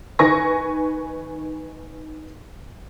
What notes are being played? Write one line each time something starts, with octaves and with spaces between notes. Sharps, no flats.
D#3 B4 G#5 C#6 A#6